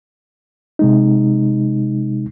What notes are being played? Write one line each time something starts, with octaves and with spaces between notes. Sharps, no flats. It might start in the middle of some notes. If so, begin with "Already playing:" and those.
C3 G#3 D#4